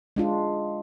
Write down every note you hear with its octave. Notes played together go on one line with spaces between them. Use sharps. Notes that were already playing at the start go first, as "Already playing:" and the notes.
G#3 D4 F4